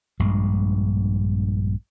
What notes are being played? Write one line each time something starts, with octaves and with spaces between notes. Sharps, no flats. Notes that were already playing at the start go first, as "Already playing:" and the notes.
A#1 G2 G#3